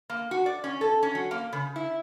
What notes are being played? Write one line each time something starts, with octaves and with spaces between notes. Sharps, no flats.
A#3
F#4
D5
C#4
A4
C#4
F#3
A#3
C#3
E4